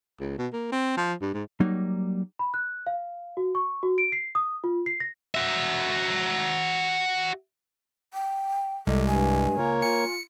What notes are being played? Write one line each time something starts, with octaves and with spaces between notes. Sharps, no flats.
C#2
B2
A#3
C4
F3
G2
G#2
F#3 G3 A#3 D#4
B5
F#6
F5
F#4
C#6
F#4
D7
C7
D#6
F4
C7
A#6
F#4 E5
G5
C2 G3 G#3 A4 D#5
G2 G#5
C#2 A#3 F4 A#4 C#5
F4 G#5 C#7